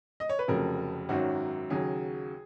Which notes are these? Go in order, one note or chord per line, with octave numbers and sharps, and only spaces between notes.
D#5
C#5
B4
F1 F2 C#3 F#3 A#4
G#1 F#2 D#3 F#3 F#4
D#2 C#3 F#3 G#4